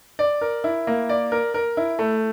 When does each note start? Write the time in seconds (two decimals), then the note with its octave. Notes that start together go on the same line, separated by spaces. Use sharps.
0.19 D5
0.41 A#4
0.64 E4
0.87 A#3
1.09 D5
1.32 A#4
1.54 A#4
1.77 E4
1.99 A3